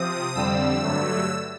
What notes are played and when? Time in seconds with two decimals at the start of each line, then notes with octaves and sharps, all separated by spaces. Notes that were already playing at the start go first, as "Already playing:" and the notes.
Already playing: C3 F3 C4 D#6
0.35 F2 D3 G3 C4 E6
0.82 G2 D3 F#3 A3